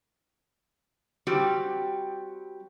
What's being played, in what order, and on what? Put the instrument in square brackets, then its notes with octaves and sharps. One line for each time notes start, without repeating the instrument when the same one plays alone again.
[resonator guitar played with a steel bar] G3 C4 F#4 G4